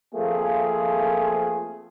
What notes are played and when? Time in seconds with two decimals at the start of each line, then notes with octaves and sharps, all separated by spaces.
0.15 F3 A3 A#3 C4 F4 G#4